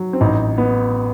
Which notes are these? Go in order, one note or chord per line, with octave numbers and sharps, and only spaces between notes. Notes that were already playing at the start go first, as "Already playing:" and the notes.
Already playing: F#3
C4
A1 D#4
B3